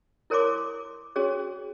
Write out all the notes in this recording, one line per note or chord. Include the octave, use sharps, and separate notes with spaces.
E4 A#4 C#5 G#5 C6 D6
C#4 F#4 G#4 C#5